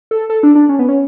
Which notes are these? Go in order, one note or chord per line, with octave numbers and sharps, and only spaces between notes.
A4
A4
D4
D4
C#4
B3
C#4